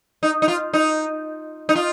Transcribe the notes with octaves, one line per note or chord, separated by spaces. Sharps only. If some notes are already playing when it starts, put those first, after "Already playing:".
D#4
D#4
F4
D#4
D#4
F4